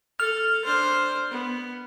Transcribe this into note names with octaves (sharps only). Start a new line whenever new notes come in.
A4 F6
D4 C5
B3